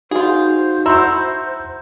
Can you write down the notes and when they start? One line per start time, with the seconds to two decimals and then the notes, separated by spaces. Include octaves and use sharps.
0.11 D#4 F4 F#4 G#4 C5
0.86 E4 F#4 A#5 C6 E6